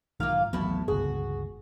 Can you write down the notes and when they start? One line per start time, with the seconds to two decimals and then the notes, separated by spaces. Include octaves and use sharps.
0.20 B1 G#2 D#3 A#3 F4 F5
0.53 A1 D#2 A2 F#3 B3 E4 A5
0.88 G1 C#2 F#4 G#4